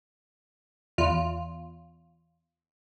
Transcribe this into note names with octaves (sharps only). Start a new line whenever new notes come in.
E2 F4